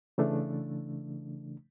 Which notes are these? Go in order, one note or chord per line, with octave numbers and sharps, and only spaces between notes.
C#3 E3 A3 D4